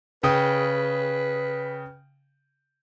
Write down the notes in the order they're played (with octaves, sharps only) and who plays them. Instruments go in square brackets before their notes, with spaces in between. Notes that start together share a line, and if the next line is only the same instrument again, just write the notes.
[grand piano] C#3 G5 D#6 [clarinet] B4